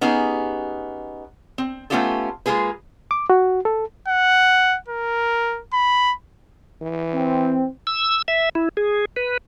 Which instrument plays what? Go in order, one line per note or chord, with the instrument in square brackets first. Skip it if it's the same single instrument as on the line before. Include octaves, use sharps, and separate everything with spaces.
[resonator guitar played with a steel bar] B3 C#4 D#4 G4 G#4
C4
A3 B3 C#4 F4 G4 A4
G#3 A#3 F4 G#4 B4
[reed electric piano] D6
F#4
A4
[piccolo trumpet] F#5
A#4
B5
[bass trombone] E3
[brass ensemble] C4
[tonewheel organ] E6
E5
E4
G#4
B4